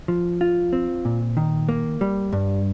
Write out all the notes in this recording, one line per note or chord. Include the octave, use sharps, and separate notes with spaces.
F3
F4
C4
A#2
D#3
A#3
G3
G2